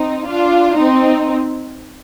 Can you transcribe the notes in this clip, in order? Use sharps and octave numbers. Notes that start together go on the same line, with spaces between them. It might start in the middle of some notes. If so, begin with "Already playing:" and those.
Already playing: C4 D#4
D4 F4
C4 D#4